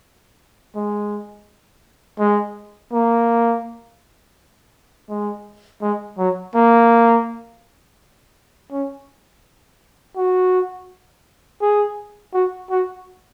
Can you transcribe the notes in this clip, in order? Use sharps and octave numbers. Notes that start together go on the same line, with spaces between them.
G#3
G#3
A#3
G#3
G#3
F#3
A#3
C#4
F#4
G#4
F#4
F#4